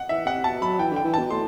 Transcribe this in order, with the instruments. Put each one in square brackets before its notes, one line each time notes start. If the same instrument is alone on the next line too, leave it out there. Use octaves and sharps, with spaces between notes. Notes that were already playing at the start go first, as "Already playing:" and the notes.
Already playing: [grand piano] F#5
[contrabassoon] E3 [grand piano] E5
[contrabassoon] C3 [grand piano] F#5
[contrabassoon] B2 [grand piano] A5
[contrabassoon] F#3 [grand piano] B5
[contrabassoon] E3 [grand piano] G5
[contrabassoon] D3 [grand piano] G5
[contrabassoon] E3
[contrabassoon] B2 [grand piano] A5
[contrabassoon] A2 [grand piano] C6